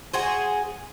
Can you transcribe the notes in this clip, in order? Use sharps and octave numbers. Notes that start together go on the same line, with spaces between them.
F#4 G#4 C5 G#5